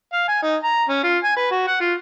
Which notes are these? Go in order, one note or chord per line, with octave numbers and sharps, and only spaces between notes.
F5
G#5
D#4
A#5
C#4
F4
G#5
B4
F#4
F#5
F4